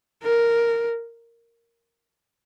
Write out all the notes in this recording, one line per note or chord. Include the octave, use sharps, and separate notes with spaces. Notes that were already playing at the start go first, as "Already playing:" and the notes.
A#4